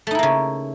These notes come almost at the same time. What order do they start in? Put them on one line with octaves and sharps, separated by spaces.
A3 D#4 E4 A#3 C#3